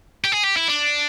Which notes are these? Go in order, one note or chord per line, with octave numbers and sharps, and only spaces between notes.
G4
G#4
G4
E4
D4